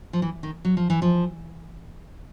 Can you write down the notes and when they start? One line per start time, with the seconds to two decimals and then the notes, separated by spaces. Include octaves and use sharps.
0.13 F3
0.22 E3
0.43 D#3
0.65 F#3
0.77 F3
0.90 E3
1.02 F3